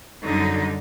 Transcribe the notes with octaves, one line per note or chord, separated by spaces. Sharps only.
F#2 D3 G3 D#4